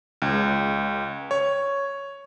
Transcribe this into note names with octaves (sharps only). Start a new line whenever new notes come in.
C#2
C#5